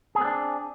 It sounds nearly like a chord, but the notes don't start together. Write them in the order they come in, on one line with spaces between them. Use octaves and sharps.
G#4 C4 B3 D4